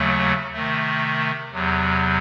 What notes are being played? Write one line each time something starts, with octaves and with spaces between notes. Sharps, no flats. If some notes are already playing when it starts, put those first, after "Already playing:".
Already playing: D#2 C#3 F#3 A3
C3 D#3 A3
E2 C3 F#3